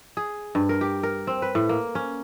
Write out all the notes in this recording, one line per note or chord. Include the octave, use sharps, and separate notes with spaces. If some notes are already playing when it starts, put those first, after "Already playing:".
G#4
G2
A#4
G4
A#4
C4
B4
A2
A#3
C#4